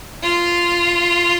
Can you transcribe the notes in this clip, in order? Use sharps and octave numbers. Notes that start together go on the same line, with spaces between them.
F4